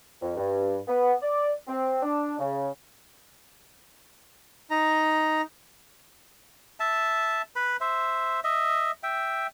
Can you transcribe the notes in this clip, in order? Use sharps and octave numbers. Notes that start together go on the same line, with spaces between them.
F2
G2
B3
D5
C4
D4
C#3
D#4 A#5
E5 A5
B4 B5
C5 E5
D#5 E5
E5 G5